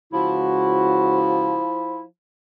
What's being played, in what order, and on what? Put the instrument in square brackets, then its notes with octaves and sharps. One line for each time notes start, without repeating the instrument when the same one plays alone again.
[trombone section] C#2 F#4 [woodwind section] F3 E4